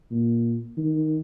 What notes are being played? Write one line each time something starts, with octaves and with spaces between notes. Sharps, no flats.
A#2
D#3